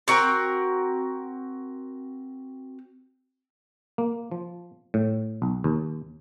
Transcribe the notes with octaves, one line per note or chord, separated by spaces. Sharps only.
C4 F#4 A#4 G5
A#3
F3
A2
B1
D#2